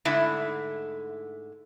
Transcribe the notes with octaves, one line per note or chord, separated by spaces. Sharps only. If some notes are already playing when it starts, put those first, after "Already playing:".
G#2 D3 A3 E4